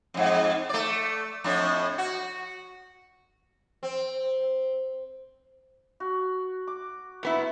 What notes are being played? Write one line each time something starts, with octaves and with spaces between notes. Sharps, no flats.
F2 G#2
A3 D5
F2 A2 D4
F#4
C4
F#4
D6
A#2 B3 E4